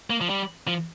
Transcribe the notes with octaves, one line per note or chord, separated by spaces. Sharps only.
A#3
F3
G3
F3